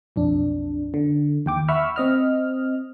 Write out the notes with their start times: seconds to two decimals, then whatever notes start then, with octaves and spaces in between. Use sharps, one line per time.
0.16 B1 F2 D4
0.94 D3
1.46 D#2 G5 D6
1.68 E5 F#5 B5 C#6 E6 F6
1.96 C4 D#5 F6